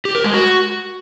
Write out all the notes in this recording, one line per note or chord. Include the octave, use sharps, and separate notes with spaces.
G4
A#4
G#3
F#4